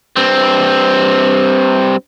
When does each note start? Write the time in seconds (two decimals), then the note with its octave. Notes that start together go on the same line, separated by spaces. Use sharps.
0.16 G2 C4